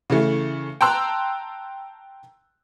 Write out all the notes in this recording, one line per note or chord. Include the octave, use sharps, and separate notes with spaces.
C#3 E3 A3
G5 A5 A#5 C6 E6 F#6